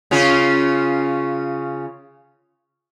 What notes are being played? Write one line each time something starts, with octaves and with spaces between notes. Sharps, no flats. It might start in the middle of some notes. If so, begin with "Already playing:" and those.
C#3 C#4 F4